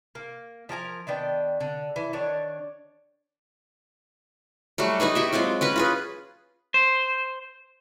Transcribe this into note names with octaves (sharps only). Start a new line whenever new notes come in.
A#3
F3 A#4 G#5 A#5
D#3 B3 D4 G5
D3
E3
D#3 D4 C#5
F#3 G3 A3 F#4
D#4 F#4 G#4 B4
F#4 G4 E5
F#3 G#3 C4 F4
C#4 F#4 B4
F4 G#4 B4
C5